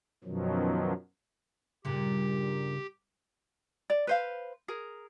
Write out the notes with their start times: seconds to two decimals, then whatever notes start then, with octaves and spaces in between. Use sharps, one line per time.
0.24 F#2 B2 D#3 F3 F#3
1.85 G2 A#2 C#3 G4
3.90 D5
4.07 B4 C5 F5
4.68 G#4 A#4